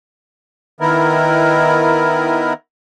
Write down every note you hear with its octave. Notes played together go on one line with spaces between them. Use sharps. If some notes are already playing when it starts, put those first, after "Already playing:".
D#3 B3 E4 A#4